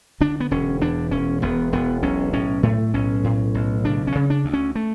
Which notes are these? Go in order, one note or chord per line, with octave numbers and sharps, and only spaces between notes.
D3 D4
B3
E1 C#4
E2 D4
E1 C#4
E1 B3
E1 B3
B1 C#4
A2 C#4
A2 A3
B1 C#4
A2
B1
C#3 D4
C#4
C#3
D4
D2
C#4
A3